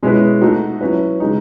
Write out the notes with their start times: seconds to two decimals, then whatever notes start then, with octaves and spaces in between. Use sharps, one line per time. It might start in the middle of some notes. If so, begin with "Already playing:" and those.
0.03 B2 G#3 C#4 E4 B4
0.41 A3 D#4 F#4
0.81 F#3 C#4 E4 B4
1.20 C#3 G#3 D#4